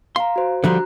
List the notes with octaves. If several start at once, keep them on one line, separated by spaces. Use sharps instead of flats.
F5 A#5 C6
F#4 C5
D3 F3 G3 F#4 A#5 F#6